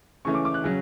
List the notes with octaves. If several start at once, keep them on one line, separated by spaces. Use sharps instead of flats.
C#3 E3 A3 C#4 C#6
D6
D6
F#6
C#3 F#3 C#4